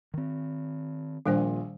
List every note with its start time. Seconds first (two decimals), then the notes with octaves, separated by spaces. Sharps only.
0.14 D#3 C4
1.26 A#1 A#2 D#3 G3 C5